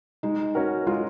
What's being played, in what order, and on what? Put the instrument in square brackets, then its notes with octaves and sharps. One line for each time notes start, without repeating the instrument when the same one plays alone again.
[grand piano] G#3 [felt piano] D#4
[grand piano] C#4 F#4 A#4
[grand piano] G#3 [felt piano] F4